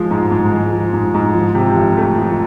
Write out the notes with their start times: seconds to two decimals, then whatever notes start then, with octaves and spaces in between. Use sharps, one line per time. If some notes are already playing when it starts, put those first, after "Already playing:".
Already playing: F3 G#3
0.11 G#2
0.31 G#2
0.52 G#3
0.72 F3
0.93 G#2
1.14 G#2
1.34 F3
1.55 C3
1.77 F2
1.97 A3
2.17 F3